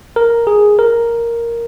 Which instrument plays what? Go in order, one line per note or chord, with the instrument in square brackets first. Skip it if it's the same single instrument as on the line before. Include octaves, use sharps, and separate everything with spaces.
[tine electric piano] A#4
G#4
A#4